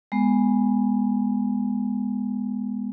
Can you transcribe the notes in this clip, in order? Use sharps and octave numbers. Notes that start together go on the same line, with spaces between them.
G#3 B3